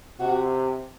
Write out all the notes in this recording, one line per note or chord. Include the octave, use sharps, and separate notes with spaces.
C3 F#4